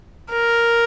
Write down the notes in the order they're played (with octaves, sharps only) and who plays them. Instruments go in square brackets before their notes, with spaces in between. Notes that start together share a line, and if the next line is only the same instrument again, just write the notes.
[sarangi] A#4